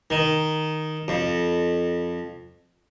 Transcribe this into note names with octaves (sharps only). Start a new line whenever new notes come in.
D#3
F2